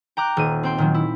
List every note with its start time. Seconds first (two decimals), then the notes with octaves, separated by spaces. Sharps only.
0.17 G5 A#5 D6 F#6
0.37 D#1 D#7
0.63 C4 G5 C6
0.78 A#2 D#3 F#3
0.94 E4